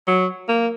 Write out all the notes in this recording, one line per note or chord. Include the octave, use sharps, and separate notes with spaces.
F#3
A#3